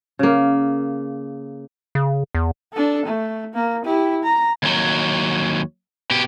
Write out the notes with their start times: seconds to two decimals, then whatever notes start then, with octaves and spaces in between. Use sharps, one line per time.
0.19 C#3 A#3
1.95 C#3
2.35 E2
2.74 D4 A4
3.06 A3
3.54 A#3
3.85 E4 G4
4.23 A#5
4.63 D#2 F#3
6.11 B2 G4